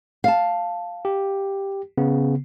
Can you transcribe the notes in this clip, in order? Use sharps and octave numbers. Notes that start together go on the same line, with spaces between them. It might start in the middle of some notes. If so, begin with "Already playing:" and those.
F5 A5
G4
C#3 B3